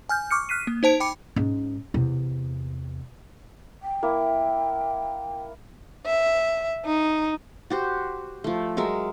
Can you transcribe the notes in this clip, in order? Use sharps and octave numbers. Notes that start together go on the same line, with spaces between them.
G#5 F6 G6
C#6 D6 F6 C#7
F6 F#6 B6 C7 D#7
A#3
D#4 C5 A5 D7
G5 B5 D6 C#7
G#2 C#4
E2 C3
G5
A#3 E4
E5
D#4
F#4 G4 C5
F3 A3
F#3 G#3 A#4 E5